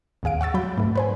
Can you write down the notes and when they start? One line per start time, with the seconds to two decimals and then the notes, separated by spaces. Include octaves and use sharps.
0.23 A1 D#2 G#4 F5 D7
0.41 F#5 C#6 E6 A6
0.54 F#3 B5 G6
0.78 G#2 A3
0.95 B4 C5 G#5